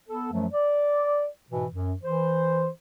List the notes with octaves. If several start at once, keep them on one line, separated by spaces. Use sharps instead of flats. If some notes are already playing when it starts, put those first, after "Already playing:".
B3 A4
F#2 F3 F#3 A3
D5
G#2 B2 E3
F#2
E3 C5